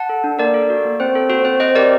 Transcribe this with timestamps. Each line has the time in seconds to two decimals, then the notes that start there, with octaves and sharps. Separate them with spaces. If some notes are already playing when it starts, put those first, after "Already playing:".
Already playing: F#5 A5
0.09 A4
0.24 D4
0.39 A#3 A#4 D5
0.54 A4
0.70 F#4
0.85 A#3
1.00 C4 C5
1.15 A4
1.30 F#4 C5
1.45 C4 C5
1.60 C4 C5 D#5
1.75 G4 A#4 D5